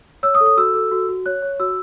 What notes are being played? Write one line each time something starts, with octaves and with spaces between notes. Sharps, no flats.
C#5 E6
D#6
A4
D#6
F#4 E6
A4
F#4
F#4
C#5 F#6
C#5
F#4 E6